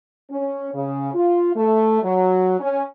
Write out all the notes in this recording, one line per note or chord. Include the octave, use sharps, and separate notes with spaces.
C#4
C#3
F4
A3
F#3
C#4